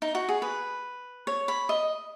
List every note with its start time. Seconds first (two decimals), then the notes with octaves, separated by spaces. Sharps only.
0.02 D#4
0.15 F#4
0.29 G#4
0.42 B4
1.27 C#5
1.48 B5
1.69 D#5